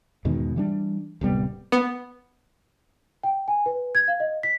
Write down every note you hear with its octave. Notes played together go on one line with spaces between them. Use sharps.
E2 G#2 B2 D#3
E3 G3 D4
D1 C2 G3 B3
B3
G5
G#5
B4
G#6
F5
D#5
B6